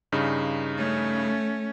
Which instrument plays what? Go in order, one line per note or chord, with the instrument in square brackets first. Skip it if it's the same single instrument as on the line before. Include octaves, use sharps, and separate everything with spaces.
[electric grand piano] G2 C#3 D#4
[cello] A3 C#4